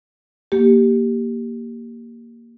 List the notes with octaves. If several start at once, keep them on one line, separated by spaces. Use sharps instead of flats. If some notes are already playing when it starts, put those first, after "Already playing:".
A#3 G4